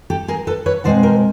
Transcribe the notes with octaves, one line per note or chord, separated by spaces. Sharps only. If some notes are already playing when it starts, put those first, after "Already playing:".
G4 A4
G#4 A#4
A4 B4
B4 C#5
B2 G#3 C4 C5 D5
A#4 C5